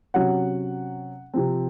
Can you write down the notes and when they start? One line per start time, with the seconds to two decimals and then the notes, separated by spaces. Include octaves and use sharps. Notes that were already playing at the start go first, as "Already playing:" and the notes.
0.14 C3 F#3 C#4 F#5
1.34 C3 F3 C4